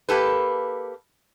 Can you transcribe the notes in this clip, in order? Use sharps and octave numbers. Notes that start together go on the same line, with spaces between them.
A#3 G4 A4 B4